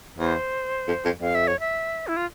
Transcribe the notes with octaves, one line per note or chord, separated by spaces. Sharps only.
E2 C5
F2
F2
F2 F5
E5
C#5
E5
E4
F4